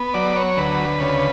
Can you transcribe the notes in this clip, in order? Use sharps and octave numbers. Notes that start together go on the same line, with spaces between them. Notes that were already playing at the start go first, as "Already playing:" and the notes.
Already playing: B3
F#3 D5
C#5
D2 B4
C#3